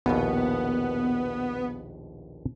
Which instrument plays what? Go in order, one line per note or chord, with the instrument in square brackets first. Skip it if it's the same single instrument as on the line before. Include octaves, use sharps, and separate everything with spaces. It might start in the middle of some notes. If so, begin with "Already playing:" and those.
[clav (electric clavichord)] A#1 D#2 B2 [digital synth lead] B3